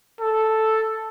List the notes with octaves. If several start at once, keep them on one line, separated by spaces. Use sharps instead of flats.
A4